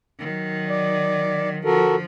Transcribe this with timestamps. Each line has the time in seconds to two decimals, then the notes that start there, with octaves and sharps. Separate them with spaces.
0.19 D#3 F#3
0.70 D5
1.65 D3 F3 F#4 A4 A#4